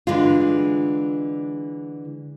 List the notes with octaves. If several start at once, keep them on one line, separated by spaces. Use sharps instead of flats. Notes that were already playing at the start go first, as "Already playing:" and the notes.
D3 E3 G#3 F4